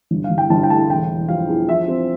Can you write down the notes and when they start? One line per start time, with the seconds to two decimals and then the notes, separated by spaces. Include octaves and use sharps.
0.11 G1
0.24 F5
0.30 G1
0.38 G5
0.50 G1 A5
0.63 G5
0.70 A3 A5
0.89 E1 G5
1.10 E1
1.29 F3 F5
1.48 E2
1.69 F3 E5
1.88 C4